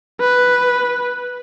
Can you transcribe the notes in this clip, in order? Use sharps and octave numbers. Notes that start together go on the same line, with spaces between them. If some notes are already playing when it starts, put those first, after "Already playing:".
B4